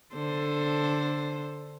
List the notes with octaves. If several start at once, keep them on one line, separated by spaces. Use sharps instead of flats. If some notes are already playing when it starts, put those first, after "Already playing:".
D3 A4 C5